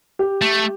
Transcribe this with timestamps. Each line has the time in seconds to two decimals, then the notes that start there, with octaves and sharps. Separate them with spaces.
0.19 G4
0.42 A3